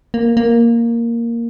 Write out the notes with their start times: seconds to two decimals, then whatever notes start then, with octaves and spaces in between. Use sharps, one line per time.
0.14 A#3
0.37 A#3